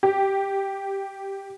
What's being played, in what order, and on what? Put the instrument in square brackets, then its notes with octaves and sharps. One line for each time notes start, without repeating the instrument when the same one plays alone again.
[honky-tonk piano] G4